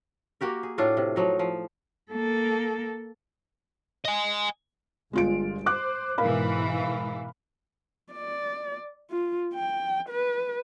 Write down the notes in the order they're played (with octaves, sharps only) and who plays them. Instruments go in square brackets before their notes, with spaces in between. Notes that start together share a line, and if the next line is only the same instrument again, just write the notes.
[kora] A#3 F#4 G4 A#4
G#4
A2 D4 F4 F#4
C3
F3 F#3 D#4
F3
[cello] A#3 A4
[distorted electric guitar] D#5 G#5
[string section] G1 [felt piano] G#3 F4 D7
[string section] C5 [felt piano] D6 F#6
[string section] G#2 B2 E3 [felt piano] A#4 F5 B5
[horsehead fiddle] D5
F4
G5
B4